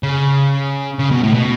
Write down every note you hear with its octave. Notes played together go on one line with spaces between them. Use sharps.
C#3
C#3
B2
A2
B2